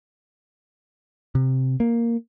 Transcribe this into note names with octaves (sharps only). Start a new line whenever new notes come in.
C3
A#3